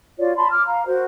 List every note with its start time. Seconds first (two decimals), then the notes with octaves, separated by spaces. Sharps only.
0.18 F4 F#4 C#5 D5
0.36 A5 B5 C6
0.52 D6 F6
0.65 F5 A#5
0.87 F#4 A#4 C5